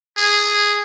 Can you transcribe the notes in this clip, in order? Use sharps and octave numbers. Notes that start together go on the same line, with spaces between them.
G#4